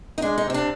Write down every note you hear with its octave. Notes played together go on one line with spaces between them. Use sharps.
D#4
G#3 D4
D#4
C3 C4
D4